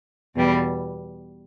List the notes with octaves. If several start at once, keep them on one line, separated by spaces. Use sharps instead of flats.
E2 B2 G3